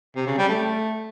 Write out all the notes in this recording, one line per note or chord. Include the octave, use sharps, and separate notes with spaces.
C3
C#3
G3
A3